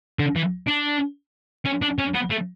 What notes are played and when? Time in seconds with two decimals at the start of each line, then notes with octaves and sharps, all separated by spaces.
0.19 D3
0.36 E3
0.68 D4
1.66 C#4
1.82 D4
1.99 C#4
2.14 B3
2.30 A3